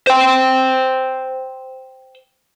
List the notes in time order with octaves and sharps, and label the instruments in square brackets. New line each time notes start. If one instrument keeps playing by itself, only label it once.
[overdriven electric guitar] C5 G5